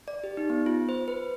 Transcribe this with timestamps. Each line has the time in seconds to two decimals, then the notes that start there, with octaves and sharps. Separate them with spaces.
0.08 D5
0.24 G4
0.37 D#4
0.50 B3
0.66 F4
0.89 C5
1.08 B4